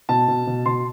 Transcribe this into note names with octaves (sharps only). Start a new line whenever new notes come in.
B2 A5
B2
B2
B2 C6